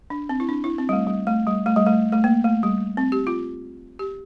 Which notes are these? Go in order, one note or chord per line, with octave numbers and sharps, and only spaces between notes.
D4
C4
E4
D4
E4
C4
G3
A3
G3
A3
G3
A3
G3
A3
A3
A#3
A3
G3
C4
G4
F4
G4